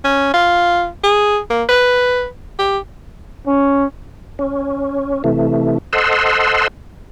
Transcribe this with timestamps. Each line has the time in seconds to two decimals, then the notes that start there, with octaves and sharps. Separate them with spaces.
0.04 C#4
0.34 F4
1.04 G#4
1.50 A#3
1.69 B4
2.59 G4
3.47 C#4
4.39 C#4
5.24 C3 E3 A3
5.93 A4 C5 D#5 F#5 C6 E6